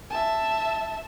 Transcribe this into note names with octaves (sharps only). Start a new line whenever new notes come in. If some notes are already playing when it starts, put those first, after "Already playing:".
E5 A5